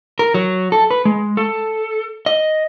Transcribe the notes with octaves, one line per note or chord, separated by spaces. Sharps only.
A#4
F#3
A4
B4
G#3
A4
D#5